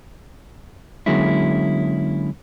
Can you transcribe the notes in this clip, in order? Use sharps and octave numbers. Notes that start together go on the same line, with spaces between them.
D3 F#3 G#3 A#3 C#4 E4